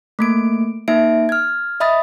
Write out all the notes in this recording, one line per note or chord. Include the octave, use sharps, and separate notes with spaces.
A3 A#3 D7
A#3 D#4 E5 D7
F6 G#6
D#5 E5 B5 D#6 A6